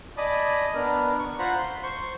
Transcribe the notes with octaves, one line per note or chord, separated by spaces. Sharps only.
D5 D#5 G#5 A5 B5 D#6
B3 D4 A#4
C#6
F4 C5 F#5 A#5 B5
C6
C5 C6 C#6